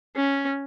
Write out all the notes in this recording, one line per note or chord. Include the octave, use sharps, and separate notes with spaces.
C#4